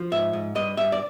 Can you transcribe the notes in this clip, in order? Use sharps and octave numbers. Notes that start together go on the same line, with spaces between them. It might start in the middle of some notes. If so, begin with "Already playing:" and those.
Already playing: F3
G#2 E5
G#2
G2 D#5
G2 E5
D5